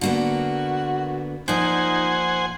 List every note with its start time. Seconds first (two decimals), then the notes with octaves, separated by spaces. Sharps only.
0.01 D3 A#3 B3 F#4
1.48 A#2 F3 D#4 C5 F#5 G#5